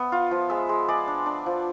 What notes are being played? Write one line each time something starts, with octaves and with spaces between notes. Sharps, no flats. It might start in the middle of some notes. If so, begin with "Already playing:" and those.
Already playing: B3 E5
F4
F3
G#3 E5
G#3
G#3 D5
D4
D4
F3